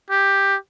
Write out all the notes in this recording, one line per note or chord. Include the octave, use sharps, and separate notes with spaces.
G4